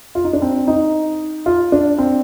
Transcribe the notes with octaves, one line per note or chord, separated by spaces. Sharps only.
F4
D#4
D4
C4
D#4
F4
D4
C4